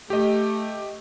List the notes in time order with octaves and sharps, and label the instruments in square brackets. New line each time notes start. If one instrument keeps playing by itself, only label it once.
[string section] A3 [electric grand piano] G4 D#5